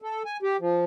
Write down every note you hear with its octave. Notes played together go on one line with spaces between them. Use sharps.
A4
G#5
G4
F3